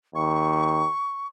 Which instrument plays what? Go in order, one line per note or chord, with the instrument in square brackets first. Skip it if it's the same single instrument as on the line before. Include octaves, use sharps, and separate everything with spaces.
[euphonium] D#2 [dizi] C#6